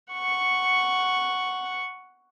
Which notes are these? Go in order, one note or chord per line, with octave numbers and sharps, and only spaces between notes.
F#5 C#6